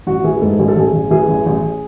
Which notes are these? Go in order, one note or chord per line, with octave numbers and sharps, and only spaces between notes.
A1 F#4
E3 G#4
G#2 A4
A1 G#4
A4
A1 G#4
A1
E3 G#4
A1
A1